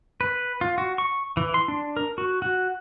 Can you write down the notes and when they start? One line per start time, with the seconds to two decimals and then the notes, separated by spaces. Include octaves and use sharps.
0.21 B4
0.61 F4
0.78 F#4
0.98 C#6
1.37 E3
1.54 C6
1.68 D4
1.97 A#4
2.18 F#4
2.42 F#4